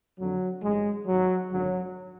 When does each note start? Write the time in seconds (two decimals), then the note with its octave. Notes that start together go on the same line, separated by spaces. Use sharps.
0.19 F2 D3 F#3
0.63 A1 G#2 G#3
1.07 G#1 G#2 F#3
1.51 G#1 F#2 D3 F#3